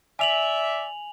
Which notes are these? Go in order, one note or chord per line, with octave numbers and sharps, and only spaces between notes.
D5 E5 G#5 F7 F#7